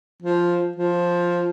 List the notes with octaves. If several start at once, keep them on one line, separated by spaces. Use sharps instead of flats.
F3
F3